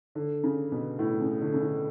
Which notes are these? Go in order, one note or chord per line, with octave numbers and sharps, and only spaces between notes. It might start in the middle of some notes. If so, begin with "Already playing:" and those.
D3
C#3
B2
A2
C#3
D3
C#3
D3